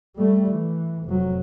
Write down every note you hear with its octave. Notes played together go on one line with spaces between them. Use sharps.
G3 A3
E3
F1 F#3